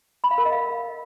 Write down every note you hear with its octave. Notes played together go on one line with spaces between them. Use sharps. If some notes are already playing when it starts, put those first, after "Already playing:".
B5
F5
A#4
D#5
F5